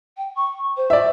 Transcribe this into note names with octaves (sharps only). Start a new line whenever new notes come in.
G5
C#6
C5
D5 E5